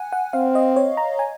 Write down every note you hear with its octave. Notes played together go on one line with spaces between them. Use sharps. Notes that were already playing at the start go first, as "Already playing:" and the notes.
Already playing: F#5 G#5
F#5
C4 F5
D#5
C#5
A#5
G#5